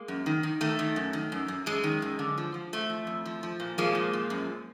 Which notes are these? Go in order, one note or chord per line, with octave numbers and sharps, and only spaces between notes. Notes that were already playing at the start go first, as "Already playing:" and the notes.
Already playing: G#3 A#3
F#2
D#3
D#3
D#3 A3
D#3
F#2
D#3
F#2
F#2
F#2 G#3
D#3
F#2
D3
F3
F3
F2 A3
F3
F2
F3
F3
A#2
F3 G#3 A#3
A#2
F3
F#2